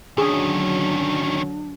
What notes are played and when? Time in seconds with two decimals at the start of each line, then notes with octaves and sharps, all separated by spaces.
0.18 D3 D#3 F#3 C#4 D4 G#4